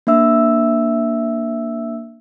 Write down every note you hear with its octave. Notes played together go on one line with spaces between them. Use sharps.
A#3 D4 E5 E6